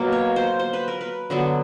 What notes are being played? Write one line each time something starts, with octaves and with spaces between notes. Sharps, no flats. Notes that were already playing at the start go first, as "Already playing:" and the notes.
Already playing: B2 F#3 A#3
C#5
C5
C5
B4
A#4
B4
D3 F#3 B3